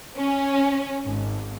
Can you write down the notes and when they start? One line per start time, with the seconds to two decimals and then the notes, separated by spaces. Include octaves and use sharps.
0.17 C#4
1.06 G#1